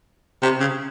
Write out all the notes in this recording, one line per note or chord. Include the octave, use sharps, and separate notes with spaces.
C3
C#3